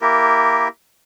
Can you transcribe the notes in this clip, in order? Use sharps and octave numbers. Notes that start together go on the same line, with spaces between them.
A#3 E4 G4 A#4